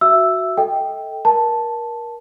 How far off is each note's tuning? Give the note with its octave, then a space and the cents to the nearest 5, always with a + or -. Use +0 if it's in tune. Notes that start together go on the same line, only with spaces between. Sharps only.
F#4 +0 E5 +15 E6 +0
A4 +0 D#5 +35 G5 +0
A#4 +25 A5 +0